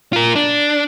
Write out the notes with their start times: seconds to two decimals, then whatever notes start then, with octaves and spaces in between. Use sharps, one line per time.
0.13 F4 A#4
0.35 D4